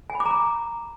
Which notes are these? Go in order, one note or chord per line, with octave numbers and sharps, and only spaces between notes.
G#5
B5
D6
A#5
D6